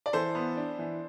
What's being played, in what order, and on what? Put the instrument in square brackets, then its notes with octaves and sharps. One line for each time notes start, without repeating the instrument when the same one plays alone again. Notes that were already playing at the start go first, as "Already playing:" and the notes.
[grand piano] D5
E3 A4 C5
B3
D4
E3